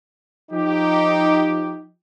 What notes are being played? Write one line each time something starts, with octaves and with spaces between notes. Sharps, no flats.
F3 D#4 G4